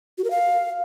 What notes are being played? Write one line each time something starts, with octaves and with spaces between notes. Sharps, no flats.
F#4
A#4
F5